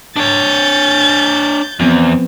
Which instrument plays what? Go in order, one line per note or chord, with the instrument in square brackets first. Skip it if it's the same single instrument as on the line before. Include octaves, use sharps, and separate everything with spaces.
[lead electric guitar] D4 C#5 [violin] G6 A6
[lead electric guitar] E2 [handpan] F3 B3 C4